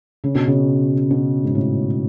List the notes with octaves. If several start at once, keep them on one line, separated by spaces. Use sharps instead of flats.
C#3
B2
C#3
B2
G#2
A2